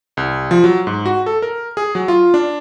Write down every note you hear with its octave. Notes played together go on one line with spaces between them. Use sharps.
C2
F3
F#3
G#2
F#4
A4
A#4
G#4
F#3
F4
D4